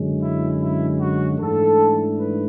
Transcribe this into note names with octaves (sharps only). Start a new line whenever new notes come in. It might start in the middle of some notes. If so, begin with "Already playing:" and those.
Already playing: F#2 D3 G#3 C#4
E4
E4
F#4
G#2 E3 A3 D4 A4
B4